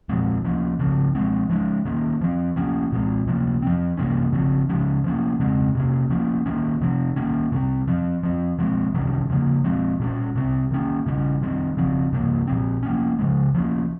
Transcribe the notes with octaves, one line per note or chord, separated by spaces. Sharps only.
A#2 F3 G#3 C4
F3 A#3 C#4
C#3 F3 C4
F3 G#3 C4
F3 G#3 C#4
D#3 A#3 C#4
F3 C4
F3 A#3 C#4
A#2 G#3 C4
C3 F3 A#3 C#4
F3 C4
C3 G3 A#3 C#4
C#3 F3 C4
C#3 F3 G#3 C#4
F3 A#3 C#4
C#3 G#3 C4
C3 G3 A#3 C#4
F3 A#3 C#4
D#3 A#3 C#4
C3 F3 C4
D#3 A#3 C#4
C3 G3 C4
F3 C4
F3 C4
F3 G#3 C4
C3 D#3 G3 C#4
C#3 F3 A#3
F3 G#3 C4
A#2 G3 C#4
C3 G3 C4
D#3 A#3 C#4
C#3 G3 C#4
D#3 G3 C4
C#3 F3 C4
C3 G3 A#3
A#2 F3 C4
F3 A#3 C#4
C#3 F3 G#3
F3 A#3 C#4